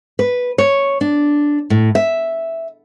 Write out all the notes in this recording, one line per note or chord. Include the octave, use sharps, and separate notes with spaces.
B4
C#5
D4
A2
E5